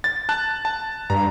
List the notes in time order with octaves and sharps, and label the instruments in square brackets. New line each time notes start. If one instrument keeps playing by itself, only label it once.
[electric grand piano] A6
A5 F#6
A5
[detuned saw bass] G2 [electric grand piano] A#5